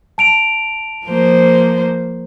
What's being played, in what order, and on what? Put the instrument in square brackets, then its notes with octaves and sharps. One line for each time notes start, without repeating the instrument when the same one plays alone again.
[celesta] A5 D7 F7
[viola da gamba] F3 A#3 C5